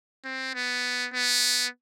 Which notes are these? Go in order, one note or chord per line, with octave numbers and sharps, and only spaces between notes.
C4
B3
B3